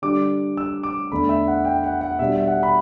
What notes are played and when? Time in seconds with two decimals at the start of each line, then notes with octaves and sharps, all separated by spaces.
0.02 D3 G3 D4 D6
0.57 E6
0.83 D6
1.12 E2 D3 A3 D4 B5
1.29 E5
1.48 F#5
1.65 G5
1.84 F#5
2.01 F#5
2.19 B2 G3 D4 E5
2.36 E5
2.47 F#5
2.63 B5